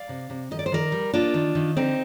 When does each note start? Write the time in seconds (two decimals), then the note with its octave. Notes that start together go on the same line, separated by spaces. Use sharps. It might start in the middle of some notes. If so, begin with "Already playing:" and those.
Already playing: D5 F5
0.09 C3
0.30 C3
0.51 D#3 D#5
0.59 D5
0.66 C5
0.72 D#3 A#4 D5
0.92 G3
1.13 A#3 D4 F4
1.34 D#3
1.55 D#3
1.77 D3 C4 D#4